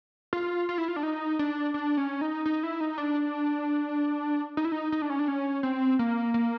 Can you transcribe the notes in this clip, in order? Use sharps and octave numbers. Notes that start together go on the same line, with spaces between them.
F4
F4
E4
F4
D4
D#4
D4
D4
C#4
D#4
D#4
E4
D#4
D4
D#4
E4
D#4
D#4
D4
C#4
D4
C#4
C4
A#3
A#3